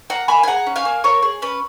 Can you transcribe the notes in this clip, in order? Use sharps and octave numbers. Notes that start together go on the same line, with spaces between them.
A#3 F#5 A#5
A#3 G#5 B5
G#5
G#4 F#5 A#5
C#4
F5 G#5
A#3
A#3 A#4 C#5
G#4
C#4 B4